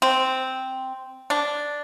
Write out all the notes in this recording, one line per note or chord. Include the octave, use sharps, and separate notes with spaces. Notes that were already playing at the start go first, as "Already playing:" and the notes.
C4
D4